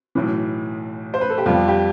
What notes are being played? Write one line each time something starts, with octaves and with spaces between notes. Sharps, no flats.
B1 A2 E3
C5
B4
A4
G4
F2 C3 G3 B3 F4
G4